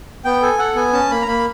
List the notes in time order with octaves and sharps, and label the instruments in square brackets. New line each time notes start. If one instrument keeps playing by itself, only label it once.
[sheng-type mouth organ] B3 G5
A4 G#5
A4 F#5
B3 G#5
C#4 A5
A#3 B5
A#5
A#3 B5